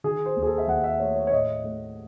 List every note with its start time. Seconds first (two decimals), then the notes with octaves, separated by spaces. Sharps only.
0.04 D#3 G#4
0.26 C5
0.36 D#2
0.43 G#4
0.47 A4
0.58 E5
0.68 D#2 F#5
0.84 E5
1.00 A3 C#5
1.16 C#5
1.27 C#5
1.32 A2 D#5
1.64 A3